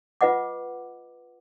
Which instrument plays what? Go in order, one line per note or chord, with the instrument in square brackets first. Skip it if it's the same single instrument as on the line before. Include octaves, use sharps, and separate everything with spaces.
[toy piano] F4 B4 D#5 F#5 D6